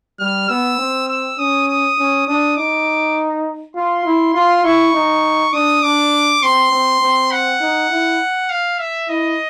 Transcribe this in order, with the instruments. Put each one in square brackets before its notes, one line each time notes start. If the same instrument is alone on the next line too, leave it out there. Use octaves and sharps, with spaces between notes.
[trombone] G3 [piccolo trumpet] F6
[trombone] B3 [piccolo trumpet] E6
[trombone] C4
[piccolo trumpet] E6
[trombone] C#4 [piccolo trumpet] D#6
[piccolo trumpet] D#6
[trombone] C#4
[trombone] D4 [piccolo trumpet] D#6
[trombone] D#4 [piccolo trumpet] D6
[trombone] F4 [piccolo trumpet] C6
[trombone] E4
[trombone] F4 [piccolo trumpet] C6
[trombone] E4 [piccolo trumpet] C#6
[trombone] D#4
[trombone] D4 [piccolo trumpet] D#6
[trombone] D4 [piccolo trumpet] D6
[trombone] C4 [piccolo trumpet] C6
[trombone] C4
C4
[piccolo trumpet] F#5
[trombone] D#4
E4
[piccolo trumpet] F5
E5
[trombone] E4 [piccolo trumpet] D#5